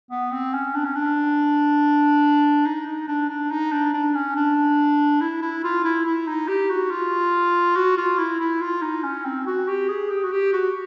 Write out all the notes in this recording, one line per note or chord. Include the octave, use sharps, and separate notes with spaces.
B3
C4
C#4
D4
C#4
D4
D#4
D#4
D4
D4
D#4
D4
D4
C#4
D4
E4
E4
F4
E4
E4
D#4
G4
F#4
F4
F#4
F4
E4
E4
F4
D#4
C#4
C4
F#4
G4
G#4
G4
F#4
G4
F#4